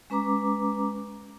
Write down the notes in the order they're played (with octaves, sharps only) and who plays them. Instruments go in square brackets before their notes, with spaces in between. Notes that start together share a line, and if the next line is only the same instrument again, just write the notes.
[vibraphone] G#3 C#4 B4 A#5 D6